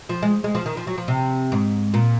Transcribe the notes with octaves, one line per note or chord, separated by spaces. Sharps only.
F3
G#3
G#3
F3
D#3
F3
F#3
F3
C3
G#2
A#2